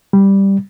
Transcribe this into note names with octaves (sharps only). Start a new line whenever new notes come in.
G3